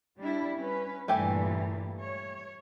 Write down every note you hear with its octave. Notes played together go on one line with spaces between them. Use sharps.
G3 D4 E4
C#4 B4
G2 A#2 E3 A3 G4 G#5
C#5